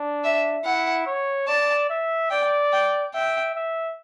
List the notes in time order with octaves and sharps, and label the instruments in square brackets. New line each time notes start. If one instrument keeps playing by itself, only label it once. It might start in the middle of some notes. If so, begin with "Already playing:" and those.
Already playing: [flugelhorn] D4
[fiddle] E5
[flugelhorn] E4 [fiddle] F#5
[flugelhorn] C#5
[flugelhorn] D5 [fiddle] A5
[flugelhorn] E5
[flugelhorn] D5 [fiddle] G5
[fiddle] G5
[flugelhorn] E5 [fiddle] G5
[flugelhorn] E5